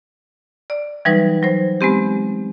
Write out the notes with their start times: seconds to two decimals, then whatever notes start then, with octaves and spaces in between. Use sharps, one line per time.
0.70 D5
1.05 E3 F#3 G3 D#4 B4
1.43 F#3 C5
1.81 G#3 B3 C4 G4